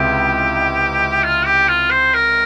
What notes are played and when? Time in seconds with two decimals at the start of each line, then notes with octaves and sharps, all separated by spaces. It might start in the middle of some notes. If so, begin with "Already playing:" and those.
Already playing: C#2 C3 G#3 E4 G4
1.24 F4
1.46 G4
1.69 F4
1.91 C5
2.14 A#4